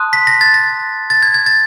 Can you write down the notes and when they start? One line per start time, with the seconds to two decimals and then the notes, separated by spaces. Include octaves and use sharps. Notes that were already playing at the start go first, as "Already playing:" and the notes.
Already playing: A5 C6 D#6 F#6
0.13 B6
0.27 A#6
0.41 A6
0.54 A#6
1.10 A6
1.23 G#6
1.34 G#6
1.46 A6